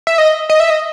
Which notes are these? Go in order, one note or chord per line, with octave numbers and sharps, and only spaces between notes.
E5
D#5
D#5
E5
D#5